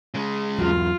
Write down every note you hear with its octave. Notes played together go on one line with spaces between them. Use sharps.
C#3 G#3
E2 F#3 F4